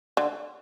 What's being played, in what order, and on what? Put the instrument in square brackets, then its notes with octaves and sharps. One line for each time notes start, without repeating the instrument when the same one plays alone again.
[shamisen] D3